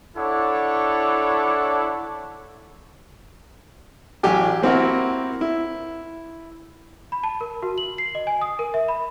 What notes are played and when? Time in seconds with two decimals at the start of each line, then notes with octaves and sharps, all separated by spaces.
0.17 D4 E4 A4 C#5 F#5 D6
4.23 A1 F#3 G4 G#5
4.62 A#3 C4 E4 F#4 A#4
5.41 E4
7.12 B5
7.23 A5
7.41 A#4
7.62 F#4
7.78 F#7
7.98 C7
8.15 D#5
8.27 G#5
8.41 D#6
8.59 A#4
8.74 E5
8.88 B5